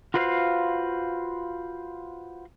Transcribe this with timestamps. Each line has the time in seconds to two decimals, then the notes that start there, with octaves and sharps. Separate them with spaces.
0.14 F4 F#4 B4 C5 E5 F5